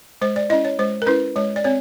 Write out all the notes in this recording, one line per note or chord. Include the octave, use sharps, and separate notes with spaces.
G#3 C5
D5
C#4 E4 D#5
C#5
G#3 C5
A#4
C#4 E4 B4
G#3 C#5
D5
C4 C#5